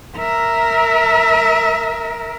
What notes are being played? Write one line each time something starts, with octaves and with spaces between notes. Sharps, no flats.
A#4 E5